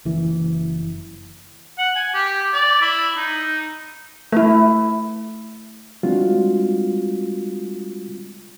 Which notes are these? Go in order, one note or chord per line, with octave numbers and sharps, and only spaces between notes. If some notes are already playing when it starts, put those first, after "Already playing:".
F#1 E3
F#5
G#5
G4
D5
E4
D#4
A3 E4
G3 G#3 C4 D4 F4 F#4